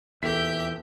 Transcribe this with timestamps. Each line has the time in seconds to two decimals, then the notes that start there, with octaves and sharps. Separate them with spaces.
0.23 D#1 E2 G4 A4 E5 G6 B6